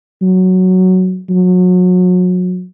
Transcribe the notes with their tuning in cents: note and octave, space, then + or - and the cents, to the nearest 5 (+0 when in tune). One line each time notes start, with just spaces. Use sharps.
F#3 +5
F#3 -30